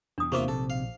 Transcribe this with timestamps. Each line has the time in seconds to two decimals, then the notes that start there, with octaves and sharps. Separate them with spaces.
0.18 E2 B2 D4 D#6
0.32 C3 A#3 F4 G4 C5 E5 D6
0.48 A#1 D#3 A4
0.70 F5